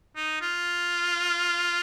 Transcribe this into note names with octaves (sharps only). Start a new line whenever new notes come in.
D#4
F4